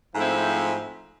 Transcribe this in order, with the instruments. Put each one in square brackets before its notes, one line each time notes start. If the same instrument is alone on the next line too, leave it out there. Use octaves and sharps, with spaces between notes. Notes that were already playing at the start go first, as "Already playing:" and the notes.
[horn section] G#2 F3 A3 C4 E4